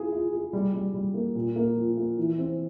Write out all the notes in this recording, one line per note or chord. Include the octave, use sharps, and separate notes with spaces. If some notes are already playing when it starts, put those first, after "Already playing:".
Already playing: E4 F4 G#4
F4
G#4
G3
G3
G3
A#3
A#2
A#3
F3
A#3
E3
C4